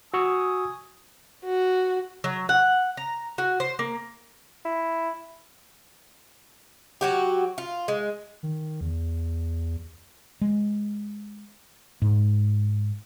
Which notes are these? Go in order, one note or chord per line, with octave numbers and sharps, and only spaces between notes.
F#4 G#5 C#6 D#6 E6
F#4
F#3
F#5
A#5
F#4
C5
A#3
E4
F#3 F#4 G4
F4
G#3
D#3
E2
G#3
G#2